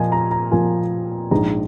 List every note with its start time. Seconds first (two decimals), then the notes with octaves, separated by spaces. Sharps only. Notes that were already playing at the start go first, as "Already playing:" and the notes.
Already playing: A#2 F3 A#3 F4 D#5 G#5
0.12 A#5
0.31 A#5
0.51 A#2 F3 A#3 F4 G#5
1.31 A#1 G#2 G#3 D#4 A#5